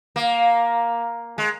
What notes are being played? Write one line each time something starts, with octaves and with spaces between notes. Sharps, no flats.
A#3
G#3